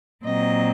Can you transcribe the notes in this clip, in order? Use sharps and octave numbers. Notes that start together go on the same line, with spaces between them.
A#2 F#3 C4 D#5